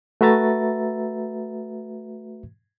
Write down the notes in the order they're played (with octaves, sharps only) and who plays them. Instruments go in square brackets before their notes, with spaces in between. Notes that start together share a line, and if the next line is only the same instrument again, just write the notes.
[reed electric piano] A3 F#4 B4 E5 A#5 A6